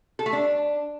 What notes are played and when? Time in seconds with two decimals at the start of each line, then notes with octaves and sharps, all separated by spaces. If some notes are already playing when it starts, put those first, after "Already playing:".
0.19 A4
0.26 A3
0.33 D4